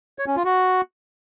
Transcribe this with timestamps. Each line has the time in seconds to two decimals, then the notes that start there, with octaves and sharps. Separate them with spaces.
0.19 C#5
0.27 C#4
0.36 F4
0.45 F#4